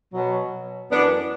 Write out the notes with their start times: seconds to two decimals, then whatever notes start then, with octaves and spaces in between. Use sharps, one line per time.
0.13 B2 F#3
0.91 F#2 E3 B3 D4